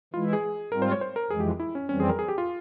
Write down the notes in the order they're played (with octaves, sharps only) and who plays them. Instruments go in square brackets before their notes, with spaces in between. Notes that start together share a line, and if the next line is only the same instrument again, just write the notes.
[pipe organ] E3 G#3 E4 [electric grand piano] F4
[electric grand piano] G#4
[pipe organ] G#2 G3 C4 F4 [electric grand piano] A#4
[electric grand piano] C5
C#5
C5
A#4
[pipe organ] F2 E3 G#3 [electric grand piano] G#4
[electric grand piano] G4
E4
C#4
[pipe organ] F2 E3 G3 C4 [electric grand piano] C#4
[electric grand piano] G#4
A#4
G#4
G4
F4